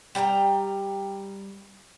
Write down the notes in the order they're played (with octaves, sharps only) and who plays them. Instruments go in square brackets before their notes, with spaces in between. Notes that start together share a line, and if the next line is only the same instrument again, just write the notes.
[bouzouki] G3 G5 G#5 A#5